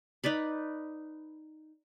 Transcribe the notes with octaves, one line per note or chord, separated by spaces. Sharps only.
D#4 B4 D5 B5